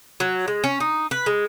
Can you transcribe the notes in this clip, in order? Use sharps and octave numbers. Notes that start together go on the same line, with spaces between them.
F#3
G#3
C#4
D#4
B4
G#3